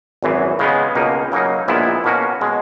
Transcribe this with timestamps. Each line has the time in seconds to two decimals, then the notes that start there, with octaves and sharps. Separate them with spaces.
0.23 G#1 F#2 E3
0.59 C#3 G#3 B3
0.95 C#2 B2 A#3 D#4
1.32 C#3 F#3 A#3 D#4
1.68 A#1 A#2 G#3 B3 E4
2.04 B2 A#3 C#4 F#4
2.41 B2 G#3